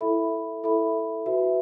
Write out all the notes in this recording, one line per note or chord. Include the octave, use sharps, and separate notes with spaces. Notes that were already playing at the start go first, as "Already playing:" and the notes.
E4 A4 E5 B5
E4 A4 E5 B5
F#4 B4 E5